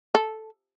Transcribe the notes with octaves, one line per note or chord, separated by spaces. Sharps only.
A4